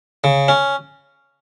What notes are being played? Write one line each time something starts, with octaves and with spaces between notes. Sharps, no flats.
C#3
C#4